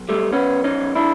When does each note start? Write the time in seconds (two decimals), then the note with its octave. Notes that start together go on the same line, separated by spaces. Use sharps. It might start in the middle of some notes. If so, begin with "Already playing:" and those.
Already playing: B1
0.09 G3 A3
0.32 B1 B3 C#4
0.64 C#4 D#4
0.81 B1
0.95 D4 E4